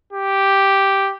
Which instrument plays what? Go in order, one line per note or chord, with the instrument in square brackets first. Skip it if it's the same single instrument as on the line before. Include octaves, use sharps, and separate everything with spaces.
[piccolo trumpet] G4